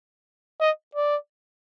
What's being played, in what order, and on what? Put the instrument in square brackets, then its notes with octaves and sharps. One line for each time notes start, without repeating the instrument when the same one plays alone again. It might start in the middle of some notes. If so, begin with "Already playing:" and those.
[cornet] D#5
D5